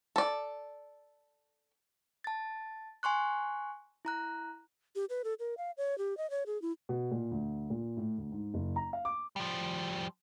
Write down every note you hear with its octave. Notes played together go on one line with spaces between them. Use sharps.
A4 D5
A5 A6
G#5 C6 C#6 F#6
E4 A#5 F#6
G4
B4
A4
A#4
F5
C#5
G4
D#5
C#5
G#4
E4
B2
A#2
D2
A#2
A2
D2
G#2
F#1
A#5
F5
D6
F3 G3